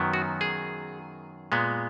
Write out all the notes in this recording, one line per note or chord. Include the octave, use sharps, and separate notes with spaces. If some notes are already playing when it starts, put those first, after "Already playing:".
Already playing: F#2 D#3 F#3 B3
F#4
G#4
A#2 G#3 B3